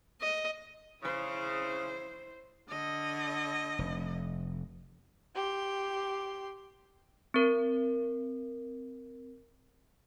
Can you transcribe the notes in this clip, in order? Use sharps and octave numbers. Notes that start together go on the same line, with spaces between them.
D#5
C#3 E4 C5
D3 D#5
F1
G4 C6
C4 A#4